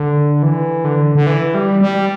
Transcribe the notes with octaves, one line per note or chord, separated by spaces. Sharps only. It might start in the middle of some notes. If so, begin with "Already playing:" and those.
Already playing: D3
E3
D3
D3
E3
G3
G3